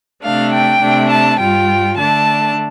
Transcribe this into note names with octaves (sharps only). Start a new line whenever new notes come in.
C3 A3 D4 F5
G5
C3 A3 D4
A5
G2 G3 F4 G5
D3 A3 D4 A5